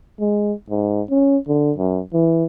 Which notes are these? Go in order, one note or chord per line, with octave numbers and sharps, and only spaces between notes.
G#3
G#2
C#4
D3
F#2
E3